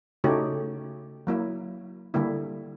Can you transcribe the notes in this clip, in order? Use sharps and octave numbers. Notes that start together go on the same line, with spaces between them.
C#3 A3 D#4 F#4 G4 C#5
F#3 A#3 E4
D3 G3 A#3 E4